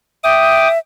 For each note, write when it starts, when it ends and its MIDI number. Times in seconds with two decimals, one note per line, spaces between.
0.24 0.78 76
0.24 0.68 79
0.24 0.68 86
0.24 0.68 87